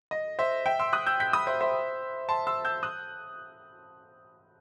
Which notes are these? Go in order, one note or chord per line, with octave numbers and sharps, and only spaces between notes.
D#5
C5 E5
E5 G5
C6 E6
D#6 F#6
E6 G6
G6 B6
B5 D#6
C5 E5
C5 E5
A5 C6
C6 E6
E6 G6
D#6 F#6